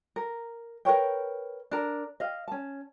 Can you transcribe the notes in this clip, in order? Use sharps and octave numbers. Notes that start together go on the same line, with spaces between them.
A#4
A#4 B4 C#5 G5
D4 A#4
D#5 F5
C#4 A5